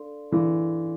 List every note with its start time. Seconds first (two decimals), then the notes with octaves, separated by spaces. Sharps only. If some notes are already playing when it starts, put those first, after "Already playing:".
Already playing: D4 A4 D5 F5 C6
0.31 E3 D4 A4 D5 F5 C6